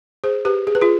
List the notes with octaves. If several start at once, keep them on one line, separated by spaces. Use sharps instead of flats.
G#4 C5
G4 B4
G#4
B4
F4 G#4